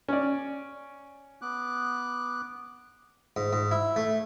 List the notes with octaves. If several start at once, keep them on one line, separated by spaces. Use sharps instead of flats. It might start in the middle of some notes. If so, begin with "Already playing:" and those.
C#4 D5
B3 D6 F#6
G#2
G#2
E4
A3